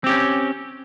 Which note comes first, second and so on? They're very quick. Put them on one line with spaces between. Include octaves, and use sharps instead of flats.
C4 G4 C#4